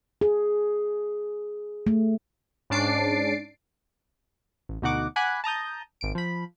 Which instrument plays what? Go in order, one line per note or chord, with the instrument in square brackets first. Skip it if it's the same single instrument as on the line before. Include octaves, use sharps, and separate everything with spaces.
[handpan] G#4
A3
[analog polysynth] G#2 C#4 D4 A6 C7 D7
[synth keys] A1
D2 B2 D#4 F#4 F#5 D6
F#5 G#5 B5 D6 F#6
A5 A#5 D#6 G6
G#1 D7
F3 B5